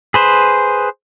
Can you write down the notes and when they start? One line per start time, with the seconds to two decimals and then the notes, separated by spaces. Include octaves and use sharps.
0.14 G#4 B4 C5